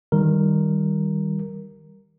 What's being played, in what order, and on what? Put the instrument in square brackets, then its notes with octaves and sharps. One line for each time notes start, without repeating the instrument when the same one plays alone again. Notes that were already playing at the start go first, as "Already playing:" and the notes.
[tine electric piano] D#3 G3 A#4